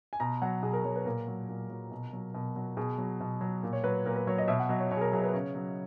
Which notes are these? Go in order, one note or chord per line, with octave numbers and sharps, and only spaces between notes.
G#5
B2 A#5
F#3 F#5
B2 G#4
A#4
F#3 C#5
B4
A#2 A#4
F#3
A#2
F#3
B2
F#3
B2
F#3
B2 G#4
F#3
B2
F#3
A#2
C#5
F#3 B4
A#2 A#4
B4
F#3 C#5
D#5
B2 E5
F#5
F#3 D#5
C#5
B2 C#5
G#4
A#4
F#3 G#4
B4
C#3 C#5
F#3